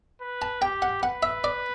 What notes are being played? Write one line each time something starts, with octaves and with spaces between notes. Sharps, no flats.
B4
A5
G4 G5
F#5
B4 F#5
E5
D5